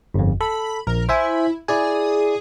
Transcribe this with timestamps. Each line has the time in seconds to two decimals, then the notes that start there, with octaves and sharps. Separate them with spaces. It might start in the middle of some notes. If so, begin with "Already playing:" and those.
0.14 G1 F2
0.41 A4 B5
0.87 A#1 A#4
1.09 E4 C5 E5 G#5
1.68 E4 G#4 D5 G#5